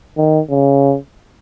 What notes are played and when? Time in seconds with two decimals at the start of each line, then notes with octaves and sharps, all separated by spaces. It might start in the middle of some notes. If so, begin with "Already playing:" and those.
0.17 D#3
0.50 C#3